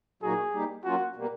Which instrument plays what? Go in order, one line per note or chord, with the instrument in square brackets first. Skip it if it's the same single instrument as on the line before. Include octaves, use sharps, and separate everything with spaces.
[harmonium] A#2 F#3 A#3 D#4 F#4 [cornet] G#4
[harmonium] G3 A#3 D#4 G4
[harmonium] F#3 A#3 C#4 F4 [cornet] F#4
[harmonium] B2 G3 A#3